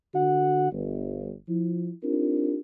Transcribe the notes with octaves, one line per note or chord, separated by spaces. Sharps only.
D3 F#4 F#5
G1
F3 E4
C4 D4 D#4 F4 G4 A#4